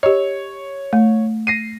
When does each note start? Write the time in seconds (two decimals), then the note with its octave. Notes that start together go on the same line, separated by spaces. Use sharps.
0.03 G4 C#5 D#5
0.93 A3
1.47 A#6 C7 D#7